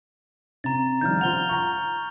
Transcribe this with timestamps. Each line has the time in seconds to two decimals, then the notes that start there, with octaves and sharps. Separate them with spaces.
0.64 C3 A#5 A6
1.01 D#3 F3 G3 F6 G6
1.21 F4 C5 F#5 F7 G7
1.49 A#5 C#6